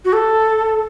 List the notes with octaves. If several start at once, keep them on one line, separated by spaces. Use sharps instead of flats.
F#4
A4